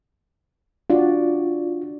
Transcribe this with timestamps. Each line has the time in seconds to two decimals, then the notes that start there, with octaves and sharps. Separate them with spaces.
0.90 D4 F4 F#4 D5